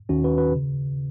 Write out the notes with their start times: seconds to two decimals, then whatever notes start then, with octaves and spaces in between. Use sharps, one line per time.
0.09 D#2 D#3 C#4 F#4
0.24 F#4 B4
0.38 F#4 B4
0.55 C#3